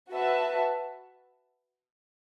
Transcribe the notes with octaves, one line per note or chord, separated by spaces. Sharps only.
F#4 B4 E5 A5